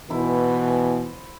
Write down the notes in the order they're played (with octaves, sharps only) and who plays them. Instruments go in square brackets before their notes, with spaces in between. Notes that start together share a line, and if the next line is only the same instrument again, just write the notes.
[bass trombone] B2 [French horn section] E3 [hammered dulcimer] E4 C5